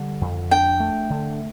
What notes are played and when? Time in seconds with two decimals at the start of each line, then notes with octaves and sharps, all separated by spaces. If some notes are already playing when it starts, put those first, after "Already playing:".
Already playing: D3 G3
0.21 F2
0.51 D4 G5
0.80 A3
1.10 D3